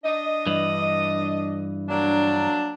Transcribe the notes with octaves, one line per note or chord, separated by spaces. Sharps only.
D4 D#5
G2 E3
F#3 A#3 D4